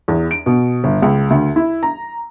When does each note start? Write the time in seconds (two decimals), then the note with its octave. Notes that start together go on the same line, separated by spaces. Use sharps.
0.08 E2
0.31 D7
0.46 B2
0.84 G1
1.02 C#2
1.30 D2
1.56 E4
1.83 A#5